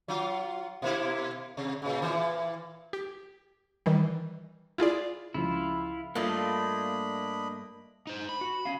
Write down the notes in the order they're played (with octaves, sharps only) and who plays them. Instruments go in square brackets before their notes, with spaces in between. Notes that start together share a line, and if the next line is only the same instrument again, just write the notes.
[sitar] F#3 F4
B2 A#3 E4
C3
A#2 C#3
A#2 E3
[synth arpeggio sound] G4
D#3 E3 G3
E4 F4 G#4 D5
[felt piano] C#2 F3 [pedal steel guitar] E4 F4
[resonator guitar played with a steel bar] G2 A3 F4 [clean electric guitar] A#3 [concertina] D4 D#5 B5
[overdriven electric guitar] D#4 C5
B5
[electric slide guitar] F#4
C#4 F5